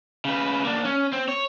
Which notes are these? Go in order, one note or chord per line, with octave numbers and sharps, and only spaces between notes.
C#3 B4
A#3 D4
C#4
C4
C#5